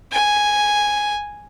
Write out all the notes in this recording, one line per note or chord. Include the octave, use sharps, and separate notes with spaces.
G#5